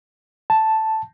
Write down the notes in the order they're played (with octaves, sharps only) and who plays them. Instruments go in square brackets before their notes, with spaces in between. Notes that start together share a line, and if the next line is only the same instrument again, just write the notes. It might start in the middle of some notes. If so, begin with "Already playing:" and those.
[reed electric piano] A5